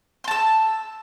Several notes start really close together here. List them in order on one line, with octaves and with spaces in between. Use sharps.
C6 A5 E6